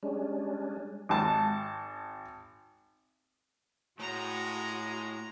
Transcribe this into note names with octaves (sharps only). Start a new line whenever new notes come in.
G3 G#3 C#4 D4
G#1 A5
A2 G#3 F#4 A#5